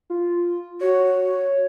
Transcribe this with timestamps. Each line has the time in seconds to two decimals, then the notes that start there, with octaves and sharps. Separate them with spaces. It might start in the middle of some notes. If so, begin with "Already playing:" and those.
0.10 F4
0.81 F#4 C#5